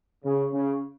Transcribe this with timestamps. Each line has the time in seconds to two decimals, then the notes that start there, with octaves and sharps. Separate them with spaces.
0.24 C#3
0.52 C#3